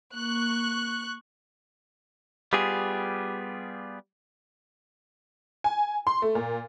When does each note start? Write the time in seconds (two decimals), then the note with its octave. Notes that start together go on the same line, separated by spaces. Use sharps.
0.15 A#3 C#6 F#6
2.53 G3 B3 F4 G4 G#4
5.64 G#5
6.07 C6
6.22 A3
6.35 A#2